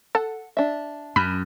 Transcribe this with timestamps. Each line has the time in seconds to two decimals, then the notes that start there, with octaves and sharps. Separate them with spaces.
0.15 A4 F#5
0.57 D4 E5
1.16 F#2 B5